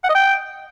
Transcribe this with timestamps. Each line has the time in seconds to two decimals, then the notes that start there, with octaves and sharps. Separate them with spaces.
0.04 F#5
0.09 D#5
0.15 G5